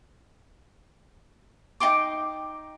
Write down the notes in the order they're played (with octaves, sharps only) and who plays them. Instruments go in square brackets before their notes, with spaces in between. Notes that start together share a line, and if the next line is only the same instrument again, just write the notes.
[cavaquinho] D#4 G5 C6 D6